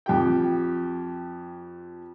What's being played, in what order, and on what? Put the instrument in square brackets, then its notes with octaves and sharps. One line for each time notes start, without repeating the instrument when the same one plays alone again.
[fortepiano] F2 G4 G5